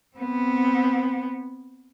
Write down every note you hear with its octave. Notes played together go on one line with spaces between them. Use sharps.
B3 C4